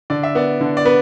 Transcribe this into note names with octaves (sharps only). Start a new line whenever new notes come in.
D3 D5
E5
B3 D5
D3
D5
B3 B4